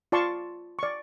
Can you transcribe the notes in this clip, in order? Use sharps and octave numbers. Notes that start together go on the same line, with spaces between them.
F4 D5 A5 C6 C#6
D5 C#6